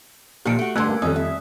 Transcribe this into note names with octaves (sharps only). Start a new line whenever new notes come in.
A#2 D#3 F3 G4 C#7 D7
A3 F#4
G2 D3 A3 C6 E6 F#6 G#6
A#3
F2 D#3 G3 C#4 A4 D#6
E5